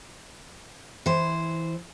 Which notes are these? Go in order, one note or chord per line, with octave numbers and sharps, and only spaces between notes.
E3 C5